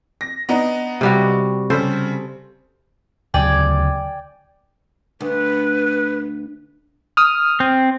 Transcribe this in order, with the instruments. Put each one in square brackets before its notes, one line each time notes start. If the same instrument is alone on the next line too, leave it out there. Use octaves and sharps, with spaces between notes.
[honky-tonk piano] A#6
B3 D4 D#4
[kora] C3 G3 F#4
[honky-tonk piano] C#3 G3 [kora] A4 C5
[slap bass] D2 C#3 F#3 [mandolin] D5 G5 G#5
[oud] D2 [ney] B4
[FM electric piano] D#6 F6
[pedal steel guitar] C4